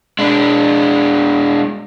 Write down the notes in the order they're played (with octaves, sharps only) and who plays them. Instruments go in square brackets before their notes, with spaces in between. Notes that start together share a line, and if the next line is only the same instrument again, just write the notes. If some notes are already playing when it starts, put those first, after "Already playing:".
[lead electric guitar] G#3 D4